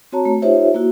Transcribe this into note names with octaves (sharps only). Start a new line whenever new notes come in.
C4 F#4 C#5 A5 A#5
A3
D#4 F4 G4 C5 C#5 E5
A#3 E4 F#4